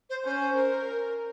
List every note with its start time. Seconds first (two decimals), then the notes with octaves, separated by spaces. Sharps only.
0.09 C5
0.24 C#4 C5
0.55 A#4